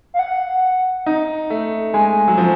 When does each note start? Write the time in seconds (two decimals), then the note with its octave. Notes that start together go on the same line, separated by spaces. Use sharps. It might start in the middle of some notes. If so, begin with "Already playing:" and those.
0.14 F5
0.19 F#5
1.06 D#4
1.50 A3
1.93 G#3 G#5
2.28 F#3
2.38 F3